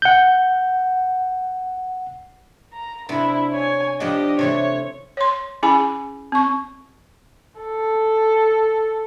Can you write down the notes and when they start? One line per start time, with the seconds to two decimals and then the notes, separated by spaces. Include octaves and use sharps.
0.02 F#5 G6
2.73 A#5
3.09 C3 B3 D4 E4
3.53 C#5 G#5
4.00 F3 B3 D4 G4 D#5
4.39 C3 E3 A3 C#5
5.17 C#5 C6
5.63 C#4 E4 G#4 G#5 B5
6.32 C4 C#6
7.60 A4